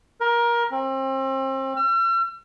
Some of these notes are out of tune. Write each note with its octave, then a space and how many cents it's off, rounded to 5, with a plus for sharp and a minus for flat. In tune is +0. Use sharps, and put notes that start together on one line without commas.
A#4 +20
C4 +35
E6 +45